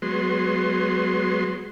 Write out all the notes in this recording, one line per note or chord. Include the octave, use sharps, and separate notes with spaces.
F#3 G#3 B3 C6